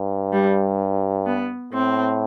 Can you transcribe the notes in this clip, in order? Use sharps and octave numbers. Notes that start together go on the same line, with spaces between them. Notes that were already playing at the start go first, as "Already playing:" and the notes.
Already playing: G2
G3
B3
A2 C4